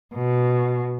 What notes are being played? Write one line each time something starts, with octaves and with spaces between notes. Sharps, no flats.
B2